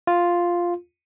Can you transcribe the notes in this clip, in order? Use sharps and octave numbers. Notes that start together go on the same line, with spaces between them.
F4